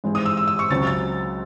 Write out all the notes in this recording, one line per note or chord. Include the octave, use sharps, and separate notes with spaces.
G#2 E3 G#3 C4
D#6
E6
E6
E6
C#6
C#2 C#3 F#3 C4 A6
A6